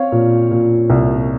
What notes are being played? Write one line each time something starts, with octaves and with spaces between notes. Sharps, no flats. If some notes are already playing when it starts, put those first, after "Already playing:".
Already playing: C4 C#5 F5
A#2
A#2
C2